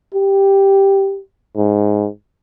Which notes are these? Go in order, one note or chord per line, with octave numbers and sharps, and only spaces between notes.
G4
G#2